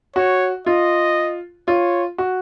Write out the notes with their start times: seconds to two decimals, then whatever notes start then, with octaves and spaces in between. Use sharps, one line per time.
0.16 F#4 C#5
0.66 F4 D#5
1.68 F4 C#5
2.18 F#4